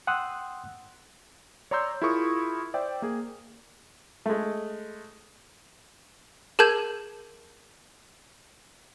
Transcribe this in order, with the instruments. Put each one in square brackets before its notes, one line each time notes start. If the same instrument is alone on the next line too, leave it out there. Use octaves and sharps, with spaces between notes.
[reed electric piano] F#5 G5 C6 D#6 E6 F#6
[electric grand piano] C#5 D5 A#5 C6 E6 G6
E4 F4 G#4 A#4 C#6 D#6
C5 D5 E5 G5
A#3 G#4
[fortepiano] G#3 A3
[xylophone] G#4 A#4 A5 G6 G#6